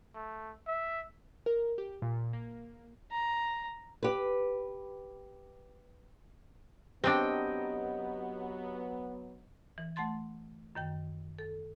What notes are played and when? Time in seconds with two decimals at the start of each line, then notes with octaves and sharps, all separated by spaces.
0.15 A3
0.67 E5
1.46 A#4
1.78 G4
2.02 A#2
2.33 A#3
3.11 A#5
4.03 G4 B4
7.04 F#3 B3 C4 D4 G4 A#4 D#5 G5
9.78 E3
9.96 A3 F#5 A5 C6 A6
10.75 F#2 D#3 G5
11.39 A4